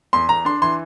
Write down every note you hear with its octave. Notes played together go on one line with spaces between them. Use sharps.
E2 C6
E2 A#5
D4 C6
E3 C6